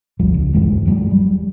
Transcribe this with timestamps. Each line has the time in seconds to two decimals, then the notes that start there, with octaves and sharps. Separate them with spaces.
0.19 G#1 D#2 F3 G3
0.34 C#2
0.54 D#1 G2 E3 G#3
0.85 E1 F#3 G#3
1.11 G3